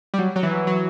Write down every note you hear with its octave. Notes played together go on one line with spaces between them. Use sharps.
G3
F#3
F#3
E3
F#3